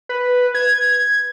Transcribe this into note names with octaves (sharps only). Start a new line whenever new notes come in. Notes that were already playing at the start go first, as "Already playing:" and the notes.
B4
G#6